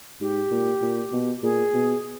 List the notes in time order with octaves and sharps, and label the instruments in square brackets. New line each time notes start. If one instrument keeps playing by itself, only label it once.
[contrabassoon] G#2 [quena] G4
[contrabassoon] A#2
A#2
B2
[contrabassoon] A#2 [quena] G#4
[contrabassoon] B2